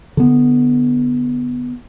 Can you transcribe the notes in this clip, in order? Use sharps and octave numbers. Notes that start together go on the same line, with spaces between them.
D3 B3